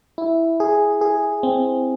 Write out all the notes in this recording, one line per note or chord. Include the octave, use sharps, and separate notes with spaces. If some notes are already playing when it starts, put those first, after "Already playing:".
E4
G#4
G#4
C4